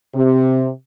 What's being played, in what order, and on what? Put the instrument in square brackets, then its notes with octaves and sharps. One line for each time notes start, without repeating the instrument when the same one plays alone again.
[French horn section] C3